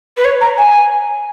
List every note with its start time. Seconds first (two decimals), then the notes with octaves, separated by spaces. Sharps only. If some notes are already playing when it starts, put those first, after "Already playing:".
0.17 B4
0.25 C#5
0.41 A#5
0.58 G#5